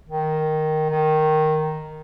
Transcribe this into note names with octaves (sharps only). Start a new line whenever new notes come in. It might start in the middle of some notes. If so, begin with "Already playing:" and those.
D#3
D#3